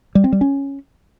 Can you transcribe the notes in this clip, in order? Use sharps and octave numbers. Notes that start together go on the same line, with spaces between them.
G3
C4
G3
C#4